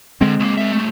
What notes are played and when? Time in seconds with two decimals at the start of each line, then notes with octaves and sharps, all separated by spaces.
0.21 D3 G#3 C4
0.40 C#2 A#3
0.58 A#4 E5
0.72 G2 A3